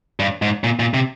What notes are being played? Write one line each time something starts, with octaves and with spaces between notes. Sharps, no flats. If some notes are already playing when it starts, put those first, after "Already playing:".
G2
G#2
A#2
A#2
C3